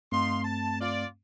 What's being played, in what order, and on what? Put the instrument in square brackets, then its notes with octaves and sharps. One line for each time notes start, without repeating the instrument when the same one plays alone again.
[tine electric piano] G2 A3 C4 [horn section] D#4 F5 C6
[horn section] A5
F4 D5